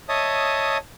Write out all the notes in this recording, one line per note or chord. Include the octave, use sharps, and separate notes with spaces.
C#5 D#5 E5 A5 D#6